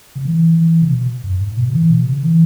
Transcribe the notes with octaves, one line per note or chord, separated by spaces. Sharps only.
C#3
E3
E3
C#3
B2
F#2
G#2
B2
C#3
E3
B2
C#3
E3